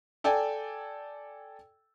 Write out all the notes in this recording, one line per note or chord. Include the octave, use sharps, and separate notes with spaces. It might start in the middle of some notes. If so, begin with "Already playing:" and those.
A4 D5 G5 G#5